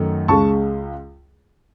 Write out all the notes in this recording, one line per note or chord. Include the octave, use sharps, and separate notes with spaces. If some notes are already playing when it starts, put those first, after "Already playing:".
Already playing: F#2 D#3 A3 D#4
C#2 C#3 G#3 A5 C#6